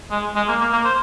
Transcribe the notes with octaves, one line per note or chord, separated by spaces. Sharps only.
G#3
G#3
A#3
A#3
A#3
C5